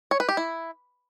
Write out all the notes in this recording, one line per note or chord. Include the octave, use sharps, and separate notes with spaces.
C#5
B4
G4
E4